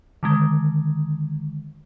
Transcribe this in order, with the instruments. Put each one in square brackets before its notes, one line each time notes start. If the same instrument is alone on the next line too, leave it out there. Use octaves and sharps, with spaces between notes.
[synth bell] D3 D#3 G#3